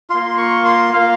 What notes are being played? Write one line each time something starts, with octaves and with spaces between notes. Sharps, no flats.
A#3 F4 C6
C#6
C6
A#3 F4 F5